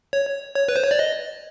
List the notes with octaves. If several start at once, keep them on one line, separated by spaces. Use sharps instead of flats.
C#5
C#5
B4
C5
C#5
D5
D#5